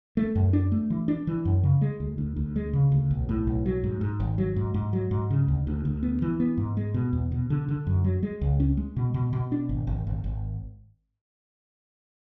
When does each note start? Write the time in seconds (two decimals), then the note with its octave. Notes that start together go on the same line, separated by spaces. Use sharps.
0.17 A3
0.35 F#2
0.53 D4
0.72 A3
0.90 E3
1.08 D4
1.27 E3
1.45 F#2
1.63 C#3
1.81 G#3
2.00 D2
2.18 D2
2.36 D2
2.56 G#3
2.73 C#3
2.92 D2
3.11 B1
3.29 A2
3.47 B1
3.66 F#3
3.84 G#2
4.01 G#2
4.20 G#1
4.38 F#3
4.56 G#2
4.74 G#2
4.93 F#3
5.11 G#2
5.30 C#3
5.48 D2
5.67 D2
5.85 D2
6.03 B3
6.22 E3
6.40 B3
6.57 G#2
6.77 G#3
6.94 B2
7.13 E2
7.32 B2
7.50 D3
7.69 D3
7.87 F#2
8.04 F#3
8.23 G#3
8.41 C#2
8.60 C#4
8.77 G#3
8.96 B2
9.14 B2
9.33 B2
9.52 D4
9.69 G#1
9.87 G#1
10.07 G#1
10.24 G#1